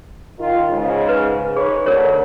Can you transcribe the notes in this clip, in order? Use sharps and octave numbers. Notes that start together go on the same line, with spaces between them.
D#3 F4
G#2 C#3
B4
D#4 G#4 B4 C#5
D2 A#4 C#5